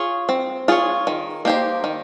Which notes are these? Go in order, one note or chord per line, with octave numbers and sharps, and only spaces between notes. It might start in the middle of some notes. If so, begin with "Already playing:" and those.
Already playing: F4 G#4 C#5
C4
F4 G#4 C#5
D#3
A#3 D#4 G4 C5
D#3